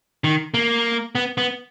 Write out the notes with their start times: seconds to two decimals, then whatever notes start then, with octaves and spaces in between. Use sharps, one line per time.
0.24 D#3
0.54 A#3
1.15 B3
1.38 B3